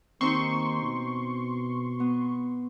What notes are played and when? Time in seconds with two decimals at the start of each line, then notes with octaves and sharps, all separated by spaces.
0.21 D#2 C4 D#4 C5 C6 C#6
0.82 B2
2.00 B3